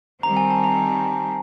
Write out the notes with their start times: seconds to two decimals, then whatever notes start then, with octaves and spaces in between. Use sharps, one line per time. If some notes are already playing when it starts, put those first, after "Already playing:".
0.23 D#3 G3 C4 A#5
0.37 G#5
0.51 A5
0.64 A#5